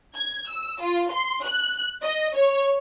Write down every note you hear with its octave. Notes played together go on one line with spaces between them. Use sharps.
G#6
E6
F4
C6
F#6
D#5
C#5